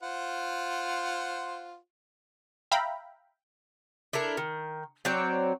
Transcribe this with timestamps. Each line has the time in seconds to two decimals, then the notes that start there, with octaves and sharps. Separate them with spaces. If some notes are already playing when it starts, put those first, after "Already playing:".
0.03 F4 C5 F#5
2.71 E5 F5 G5 A#5 B5
4.13 D4 E4 A4 A#4
4.37 D#3
5.05 F#3 C4 C#5 D5